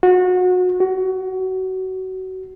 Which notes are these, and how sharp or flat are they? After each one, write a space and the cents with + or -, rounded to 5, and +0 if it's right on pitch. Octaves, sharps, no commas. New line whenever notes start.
F#4 -25
F#4 +25